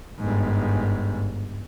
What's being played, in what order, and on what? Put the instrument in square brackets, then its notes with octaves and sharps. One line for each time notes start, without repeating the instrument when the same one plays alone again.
[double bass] G1 G#2